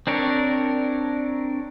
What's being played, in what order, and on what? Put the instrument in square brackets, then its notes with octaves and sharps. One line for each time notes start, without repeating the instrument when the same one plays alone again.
[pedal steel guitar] C4 D4 A#4 C#5